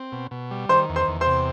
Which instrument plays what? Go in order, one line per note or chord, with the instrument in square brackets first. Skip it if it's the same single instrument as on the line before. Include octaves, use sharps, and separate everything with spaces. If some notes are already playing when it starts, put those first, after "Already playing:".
Already playing: [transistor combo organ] C4
B2
B2
G3
[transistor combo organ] D#3 [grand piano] C5 C6
[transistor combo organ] E2
[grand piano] C5 C6
[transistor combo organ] E2
[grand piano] C5 C6
[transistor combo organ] C3